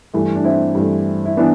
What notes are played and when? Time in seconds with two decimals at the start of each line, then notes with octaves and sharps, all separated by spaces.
0.14 G2 E3 A3
0.35 D4
0.44 C4 E4
0.75 G2 E3 A3
1.25 E4
1.37 E3 B3 D4